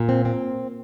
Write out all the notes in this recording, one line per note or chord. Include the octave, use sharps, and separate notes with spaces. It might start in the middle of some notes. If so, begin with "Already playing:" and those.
Already playing: A#2
C4
C4